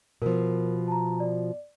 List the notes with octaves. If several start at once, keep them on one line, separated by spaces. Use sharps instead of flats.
B2 F3 A#4
A5 A#5
D5